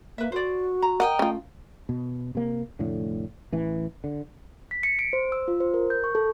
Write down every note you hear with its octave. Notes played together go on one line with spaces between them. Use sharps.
A#3 B4 E5
F#4 C5 D5
A#5
A#4 D#5 F#5 G5
A3 C#4 F4
B2
C3 A#3
F1 A2 D3
A1 E3
D3
B6
C#7
D7
C5
E6
F4
C5
A#4
G6
C#6
A4